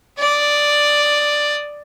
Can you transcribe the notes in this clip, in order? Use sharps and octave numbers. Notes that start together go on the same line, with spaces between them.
D5 D#6